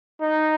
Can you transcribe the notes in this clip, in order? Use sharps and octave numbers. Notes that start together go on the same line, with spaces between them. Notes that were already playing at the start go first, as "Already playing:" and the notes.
D#4